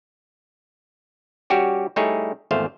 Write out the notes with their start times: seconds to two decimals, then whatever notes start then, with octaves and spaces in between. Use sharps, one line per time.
1.50 G3 C#4 F#4 G4 C#5
1.96 G3 A3 D#4 E4 G#4 C#5
2.51 G#1 E2 A3 C5 F5